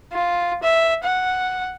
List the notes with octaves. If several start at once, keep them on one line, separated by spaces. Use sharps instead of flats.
F4
E5
F#5